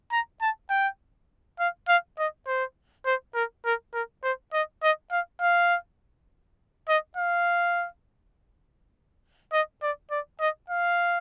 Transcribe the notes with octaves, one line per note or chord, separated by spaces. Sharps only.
A#5
A5
G5
F5
F5
D#5
C5
C5
A#4
A#4
A#4
C5
D#5
D#5
F5
F5
D#5
F5
D#5
D5
D5
D#5
F5